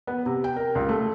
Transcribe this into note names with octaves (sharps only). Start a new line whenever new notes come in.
B3
C3
G5
A#4
C#2
A3